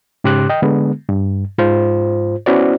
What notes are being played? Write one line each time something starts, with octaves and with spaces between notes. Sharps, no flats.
G#2 C#3 G4 C6 D6 F#6
D#5 G5
D3 G#3 B3
G2
G#2 F4 C5
B3 C#4 E4 F#4 C5 D5